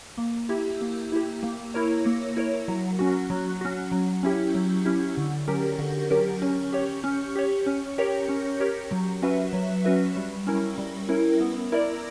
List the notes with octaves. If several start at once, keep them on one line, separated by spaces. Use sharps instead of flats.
A#3
E4 G4
A#3
E4 G4
A#3
E4 A#4 C#5
A#3
E4 A#4 C#5
F#3
C#4 F#4
F#3
C#4 F#4
F#3
C#4 E4 G4
F#3
C#4 E4 G4
D3
F#3 C#4 G4 A#4
D3
F#3 C#4 G4 A#4
C#4
G4 C#5
C#4
G4 C#5
C#4
G4 A#4 C#5
C#4
G4 A#4 C#5
F#3
C#4 F#4 B4 E5
F#3
C#4 F#4 B4 E5
G3
C#4 E4 A#4
G3
C#4 E4 A#4
B3
E4 A#4 D5